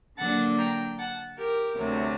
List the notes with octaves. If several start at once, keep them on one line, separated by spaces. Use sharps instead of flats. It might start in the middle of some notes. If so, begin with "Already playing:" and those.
D3 F#3 A#3 D4 F#5 A5
G5 A#5
F#5 A5
G4 A#4
D2 C3 F#3 A3